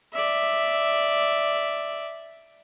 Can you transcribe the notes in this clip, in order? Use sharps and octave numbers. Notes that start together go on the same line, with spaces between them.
D5 E5